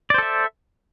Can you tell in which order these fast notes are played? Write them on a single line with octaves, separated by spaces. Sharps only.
D5 C5 A4 E5